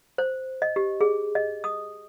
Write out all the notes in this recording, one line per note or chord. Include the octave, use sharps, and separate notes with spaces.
C5
D#5
G4
G#4
D#5
D#6